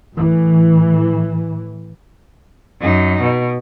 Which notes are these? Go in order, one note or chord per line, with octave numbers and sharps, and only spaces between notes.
A2 E3
F#2 D#4
B2